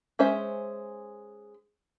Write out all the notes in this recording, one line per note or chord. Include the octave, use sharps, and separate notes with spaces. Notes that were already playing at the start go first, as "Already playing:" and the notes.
G#3 C#4 C5 E5